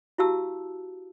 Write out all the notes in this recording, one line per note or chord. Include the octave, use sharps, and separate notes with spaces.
E4 F#4 G4 F5 A5 E6